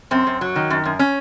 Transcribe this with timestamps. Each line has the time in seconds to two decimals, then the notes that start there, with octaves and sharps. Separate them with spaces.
0.11 F#2 C4
0.27 F#2
0.41 F#3
0.56 D#3
0.70 F#2
0.85 F#2
0.99 C#4